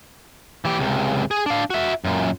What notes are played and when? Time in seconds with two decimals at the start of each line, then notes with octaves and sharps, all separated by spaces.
0.65 E3 G4
0.79 C#2 C3
1.31 G#4
1.46 D4 F5
1.70 F#4 E5
2.05 F#2 A#2